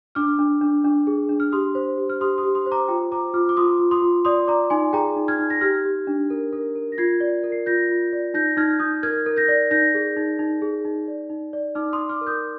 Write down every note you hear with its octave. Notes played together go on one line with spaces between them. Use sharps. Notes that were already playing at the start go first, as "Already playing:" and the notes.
D4 D6 F6
D4
D4
D4
G#4
D4
F6
G4 C6 D#6
C5
G4
F6
G4 C6 D#6
C6 D#6
G4
C6 D#6
C5
A#5 D6
F4 G5 A#5
C5 A#5 D6
F4 D6 F6
D6
F4 C6 D#6
F4
C6 D#6
F4
D5 C6 D#6
D5 A#5 D6
D#4 G#5 C6
G#4 G5 A#5
D#4
F6 G#6
D#4
A#6
G4 F6 G#6
G4
D4
A#4
A#4
A#4
A#6
F4 G#6 C7
D5
A#4
C7
F4 G6 A#6
F4
D5
D#4 G6 A#6
D#4 F6 G#6
D#4 D#6 G6
A#4 F6 G#6
A#4
G6 A#6
D5
D#4 G6 A#6
G#4
D#4
D#4
G#4
D#4
D5
D#4
D5
D#4 D6 F6
C6 D#6
D#4
D6 F6
A#4
D#6 G6